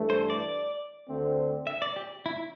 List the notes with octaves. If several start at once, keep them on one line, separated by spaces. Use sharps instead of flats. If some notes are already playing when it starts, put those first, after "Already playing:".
Already playing: G2 E3 A3
C5
D5
D2 D3 A3 C4
E5
D5
G4
E4